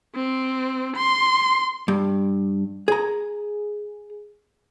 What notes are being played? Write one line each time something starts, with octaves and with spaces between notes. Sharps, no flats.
C4
C6
G2
G#4 A#5